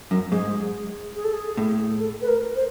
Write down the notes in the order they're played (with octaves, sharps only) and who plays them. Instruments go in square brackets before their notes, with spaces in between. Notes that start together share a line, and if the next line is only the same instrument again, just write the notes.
[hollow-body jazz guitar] F#2
[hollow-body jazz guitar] G#2 [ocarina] G#4
[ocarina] G#4
A4
G#4
[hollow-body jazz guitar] A2
[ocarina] A4
B4
A#4
C5